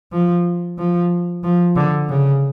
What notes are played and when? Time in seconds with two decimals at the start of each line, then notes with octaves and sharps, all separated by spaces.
0.12 F3
0.78 F3
1.44 F3
1.76 D3
2.09 C#3